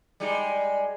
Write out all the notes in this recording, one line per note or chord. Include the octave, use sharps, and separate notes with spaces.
G3 G#3 D#4